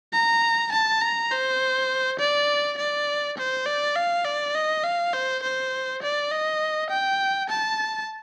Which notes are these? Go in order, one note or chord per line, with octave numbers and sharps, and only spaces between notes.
A#5
A5
A#5
C5
D5
D5
C5
D5
F5
D5
D#5
F5
C5
C5
D5
D#5
G5
A5